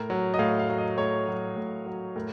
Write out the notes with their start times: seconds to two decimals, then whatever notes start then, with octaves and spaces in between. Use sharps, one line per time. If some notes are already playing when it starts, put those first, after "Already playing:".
Already playing: A2 A#4
0.10 F#3
0.34 D#5
0.39 A2 F5
0.59 F5
0.69 F#3
0.78 D#5
0.98 A2 C#5
1.28 F#3
1.56 A2
1.86 F#3
2.16 A2 A#4